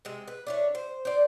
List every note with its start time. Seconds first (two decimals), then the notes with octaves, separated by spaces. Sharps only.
0.05 C3 G#3
0.28 B4
0.47 D4 E4 C#5
0.75 C5
1.05 C5 D5